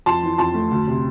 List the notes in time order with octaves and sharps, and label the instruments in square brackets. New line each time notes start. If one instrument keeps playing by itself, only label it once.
[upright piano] F2 A5 C6
E3
F2 A5 C6
A3
D2
C3